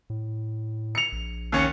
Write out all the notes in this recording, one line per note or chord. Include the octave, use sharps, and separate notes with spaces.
A2
C#7 F7
A#1
D#2 C#4 C#7